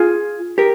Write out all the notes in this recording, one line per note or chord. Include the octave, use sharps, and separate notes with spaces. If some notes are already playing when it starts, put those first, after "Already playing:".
Already playing: F4 G#4
G4 A#4